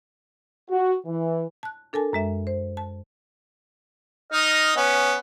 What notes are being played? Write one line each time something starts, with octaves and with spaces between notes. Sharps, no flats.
F#4
E3
A5 F#6
D4 A4 A#4 G#5 A5
F#2 G#3 E5
C5
A5
D#4 D#5 F6
B3 C#4